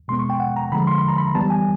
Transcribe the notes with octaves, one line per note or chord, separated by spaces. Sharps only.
B2 G#3 B3 C6
C#6
G5
F#5
A#5
D3 F3 G#3 B5
C6
B5
A#5
B5
E3 G3 B3 A5
G#5